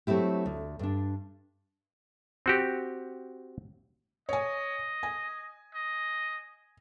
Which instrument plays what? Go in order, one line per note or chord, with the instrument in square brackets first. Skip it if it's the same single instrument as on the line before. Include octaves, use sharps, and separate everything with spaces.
[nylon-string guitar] F#3 A3 C4 E4 G4
D2
G2 D4
[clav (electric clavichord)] C4 F#4 G4
[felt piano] C#5 G#5 [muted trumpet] D#5
[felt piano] G#5
[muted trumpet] D#5